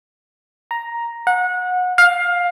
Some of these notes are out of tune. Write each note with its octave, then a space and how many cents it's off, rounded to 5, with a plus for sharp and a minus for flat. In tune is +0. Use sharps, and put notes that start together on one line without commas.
A#5 +5
F#5 -25
F5 +15